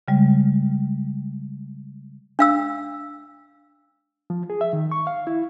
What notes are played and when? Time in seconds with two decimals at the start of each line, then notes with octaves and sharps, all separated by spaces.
0.08 C#3 G3 G#3
2.39 D4 F5 E6
4.30 F3
4.50 G#4
4.61 E5
4.73 D#3
4.92 C#6
5.07 F5
5.27 E4